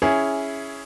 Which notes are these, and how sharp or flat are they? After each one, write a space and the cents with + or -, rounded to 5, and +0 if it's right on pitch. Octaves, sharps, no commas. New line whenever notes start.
C#4 +5 E4 +0 G#4 +0